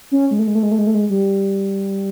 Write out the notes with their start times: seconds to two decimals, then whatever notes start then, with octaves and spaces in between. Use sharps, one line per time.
0.12 C#4
0.31 G#3
0.39 A3
0.47 G#3
0.55 A3
0.63 G#3
0.71 A3
0.78 G#3
0.87 A3
0.94 G#3
1.10 G3